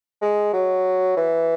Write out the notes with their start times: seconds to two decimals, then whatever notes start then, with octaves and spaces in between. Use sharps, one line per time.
0.22 G#3
0.53 F#3
1.17 E3